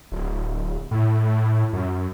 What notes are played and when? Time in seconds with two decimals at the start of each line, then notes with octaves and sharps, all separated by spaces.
0.12 D1
0.91 A2
1.73 F#2